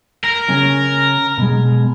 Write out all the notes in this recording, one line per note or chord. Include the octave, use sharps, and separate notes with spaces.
A#4
C#3 C#4 G#5
B2 G#3